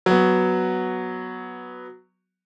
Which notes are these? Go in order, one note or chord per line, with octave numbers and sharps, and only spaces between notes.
F#3 B3